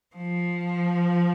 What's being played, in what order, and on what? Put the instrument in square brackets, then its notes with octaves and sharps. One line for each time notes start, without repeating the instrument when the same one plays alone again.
[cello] F3